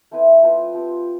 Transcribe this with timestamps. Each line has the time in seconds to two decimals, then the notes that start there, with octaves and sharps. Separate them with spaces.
0.11 A3 C4 E4 B4
0.43 F3 C4 F4 B4
0.74 F3 C4 G4 B4